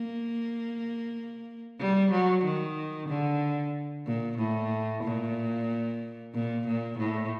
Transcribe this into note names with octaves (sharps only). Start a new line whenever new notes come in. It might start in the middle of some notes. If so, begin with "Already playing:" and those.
Already playing: A#3
G3
F#3
D#3
D3
A#2
A2
A#2
A#2
A#2
A2